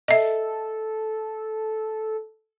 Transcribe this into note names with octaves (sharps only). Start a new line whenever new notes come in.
A4 D#5 E5